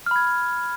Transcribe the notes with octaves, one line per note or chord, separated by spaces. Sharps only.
B5 F6 G#6